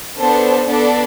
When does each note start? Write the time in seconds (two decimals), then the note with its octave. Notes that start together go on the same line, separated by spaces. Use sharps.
0.18 B3 D4 A4 C5
0.67 B3 D4 A4 D5